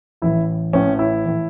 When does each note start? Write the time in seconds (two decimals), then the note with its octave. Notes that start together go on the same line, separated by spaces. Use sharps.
0.22 A1 A2 E3 E4
0.73 A1 A2 E3 C#4
0.99 E4
1.25 A2 E3